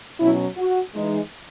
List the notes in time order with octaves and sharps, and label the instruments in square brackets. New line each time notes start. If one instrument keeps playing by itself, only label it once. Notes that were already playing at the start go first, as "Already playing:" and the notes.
[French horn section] B2 F#3 C#4 E4
F#4
E3 G#3 D#4